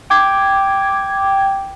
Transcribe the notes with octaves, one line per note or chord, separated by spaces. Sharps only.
G5 D6 G#6